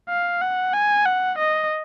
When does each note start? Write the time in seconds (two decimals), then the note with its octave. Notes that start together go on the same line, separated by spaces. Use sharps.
0.09 F5
0.41 F#5
0.73 G#5
1.05 F#5
1.38 D#5